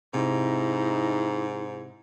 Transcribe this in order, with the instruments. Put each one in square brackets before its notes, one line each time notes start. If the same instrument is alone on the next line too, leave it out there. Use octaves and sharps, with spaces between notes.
[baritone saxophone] G#2 [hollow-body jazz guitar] C3 [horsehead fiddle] D#4 E4